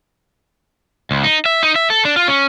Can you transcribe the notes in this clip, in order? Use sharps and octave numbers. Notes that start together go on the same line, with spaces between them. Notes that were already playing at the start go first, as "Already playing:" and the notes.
C#2
D#4
E5
D#4
E5
A4
D4
F4
C#4